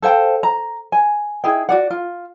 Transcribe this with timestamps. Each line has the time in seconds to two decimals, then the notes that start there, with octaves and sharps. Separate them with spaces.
0.02 A4 C5 F5 G5
0.43 A#5
0.92 G#5
1.44 D#4 E4 G#4 G5
1.69 F#4 D5 F#5
1.91 F4